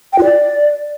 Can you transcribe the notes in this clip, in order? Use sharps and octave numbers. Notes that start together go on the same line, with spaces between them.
G5
F4
D5